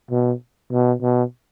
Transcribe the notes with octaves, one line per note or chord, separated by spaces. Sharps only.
B2
B2
B2